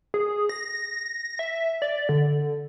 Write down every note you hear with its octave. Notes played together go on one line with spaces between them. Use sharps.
G#4
A#6
E5
D5
D3